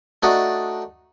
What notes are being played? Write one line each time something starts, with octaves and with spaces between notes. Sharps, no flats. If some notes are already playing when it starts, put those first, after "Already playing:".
A3 D4 D#4 F#4